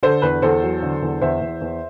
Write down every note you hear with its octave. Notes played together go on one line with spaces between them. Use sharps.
D3 A4 C5
E2 B4
E2 A4 C5
F#3
D3
E2
E2 C5 E5
E2
E2